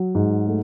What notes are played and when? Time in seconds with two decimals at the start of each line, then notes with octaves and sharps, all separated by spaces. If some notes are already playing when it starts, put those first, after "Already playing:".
Already playing: F#3
0.15 G#2
0.47 A3